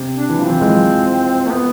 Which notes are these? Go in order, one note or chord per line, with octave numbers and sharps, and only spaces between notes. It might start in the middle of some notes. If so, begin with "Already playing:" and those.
Already playing: C3
D4
E3
F3 C4
E3
G#3
F3
A3
B3